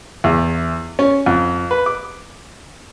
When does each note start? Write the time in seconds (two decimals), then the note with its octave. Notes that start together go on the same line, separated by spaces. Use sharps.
0.24 E2
0.99 C#4
1.26 F2
1.71 B4
1.86 D6